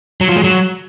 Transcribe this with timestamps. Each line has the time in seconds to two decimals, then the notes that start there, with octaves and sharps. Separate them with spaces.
0.21 F#3
0.28 F3
0.36 G#3
0.44 F#3